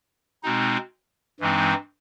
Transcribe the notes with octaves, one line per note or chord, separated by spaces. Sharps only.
B2 G#3 C4 D#4
G2 E3 G#3 C4 D#4